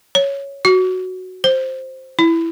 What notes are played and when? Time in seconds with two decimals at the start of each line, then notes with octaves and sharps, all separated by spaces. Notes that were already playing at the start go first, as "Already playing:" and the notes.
0.15 C#5
0.65 F#4
1.44 C5
2.19 E4